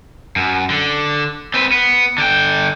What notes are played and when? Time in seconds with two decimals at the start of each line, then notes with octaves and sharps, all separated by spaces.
0.36 F#2
0.70 D3
1.54 C4 B4
1.72 B3
2.18 D3 G5